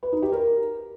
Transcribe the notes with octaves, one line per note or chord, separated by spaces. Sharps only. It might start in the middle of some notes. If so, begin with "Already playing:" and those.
B4
D#4
G4
A#4